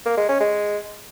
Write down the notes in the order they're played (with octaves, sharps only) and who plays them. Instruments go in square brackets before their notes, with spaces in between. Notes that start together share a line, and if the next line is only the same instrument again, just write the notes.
[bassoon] A#3
G#3
C#4
G#3